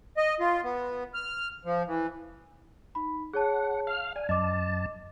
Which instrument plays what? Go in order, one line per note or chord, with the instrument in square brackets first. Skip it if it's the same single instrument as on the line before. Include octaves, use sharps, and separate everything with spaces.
[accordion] D#5
F4
B3
F6
F3
E3
[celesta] D#4 B5
[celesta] G#4 C#5 A5 [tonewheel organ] F#5
[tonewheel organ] F5 F6
[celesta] D5 [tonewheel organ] G#5
[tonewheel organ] F#2 A5 [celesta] D#5 D6